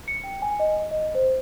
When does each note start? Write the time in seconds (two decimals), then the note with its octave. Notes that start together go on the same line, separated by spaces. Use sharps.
0.08 C#7
0.24 G5
0.42 G#5
0.60 D#5
0.91 D#5
1.15 C5